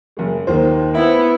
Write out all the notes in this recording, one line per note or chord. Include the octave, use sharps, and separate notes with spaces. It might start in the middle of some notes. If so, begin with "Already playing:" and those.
F#1 G#3
D#2 D#3 C5
B3 E4 E5